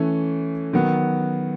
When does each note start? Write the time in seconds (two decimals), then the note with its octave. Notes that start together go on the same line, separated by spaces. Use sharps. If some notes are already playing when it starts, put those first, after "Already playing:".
Already playing: E3 A3 C#4
0.73 D#3 F#3 B3